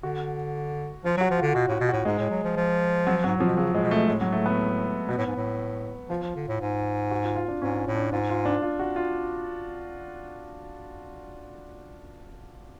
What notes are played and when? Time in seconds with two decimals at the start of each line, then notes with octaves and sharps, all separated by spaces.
0.03 D3 F#4
1.04 F3 F4
1.17 F#3 F#4
1.30 F3
1.38 F4
1.42 D3
1.55 B2 F#4
1.68 A2 F#4
1.80 B2
1.89 F#4
1.93 A2
2.05 G#2 G#3
2.19 A2
2.31 F#3
2.44 F3
2.56 F3
3.07 F#3
3.24 G#2 F#3
3.36 A2 F3
3.47 B2
3.57 C#3 F#3
3.73 A2 G#3
3.82 B2
3.91 A3
4.08 A2 G#3
4.21 F#3
4.32 A3
4.46 B3
5.09 B2 B3
5.17 A2
5.26 G#2
5.36 A2
6.09 F3 F4
6.23 F3
6.35 D3
6.48 A2
6.60 G#2
7.11 F#4
7.23 F4
7.36 F4
7.48 D4
7.61 G#2 C#4
7.87 A2
7.95 D4
8.12 G#2 F4
8.29 F4
8.45 D4
8.62 F4
8.79 F#4
8.96 F4